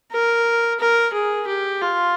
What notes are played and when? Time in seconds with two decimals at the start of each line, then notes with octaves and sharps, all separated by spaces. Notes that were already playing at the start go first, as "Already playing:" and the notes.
0.12 A#4
0.80 A#4
1.13 G#4
1.47 G4
1.81 F4